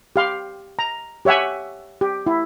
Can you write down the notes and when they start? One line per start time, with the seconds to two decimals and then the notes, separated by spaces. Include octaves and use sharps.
0.16 G4 F5 C6
0.79 A#5
1.25 G4 C#5 E5 F#5 G#5
2.01 G4
2.27 E4